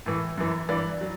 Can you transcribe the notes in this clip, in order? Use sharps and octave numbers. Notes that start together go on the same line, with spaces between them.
A2 E3
F#2 E3
G2 E3 D5
F#3